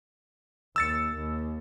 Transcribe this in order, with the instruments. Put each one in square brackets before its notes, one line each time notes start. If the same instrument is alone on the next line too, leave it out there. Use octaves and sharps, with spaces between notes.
[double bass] D#2 [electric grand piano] E6 A6 C#7
[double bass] D#2